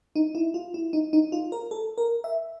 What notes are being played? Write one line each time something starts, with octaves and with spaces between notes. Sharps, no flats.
D#4
E4
F4
E4
D#4
D#4
F4
A#4
A4
A#4
E5